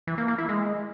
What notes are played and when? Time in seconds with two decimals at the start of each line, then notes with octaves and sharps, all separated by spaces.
0.07 E3
0.18 A#3
0.28 A#3
0.38 E4
0.49 G#3